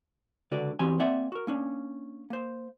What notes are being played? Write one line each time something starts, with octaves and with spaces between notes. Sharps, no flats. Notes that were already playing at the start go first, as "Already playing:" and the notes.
C#2 D3 F#4 B4 D5
E2 E3 C4 F#4 G4 G#5
A#3 C4 D5 E5 F#5 G#5
F#4 A#4
A#3 C#4 D4
A#3 C5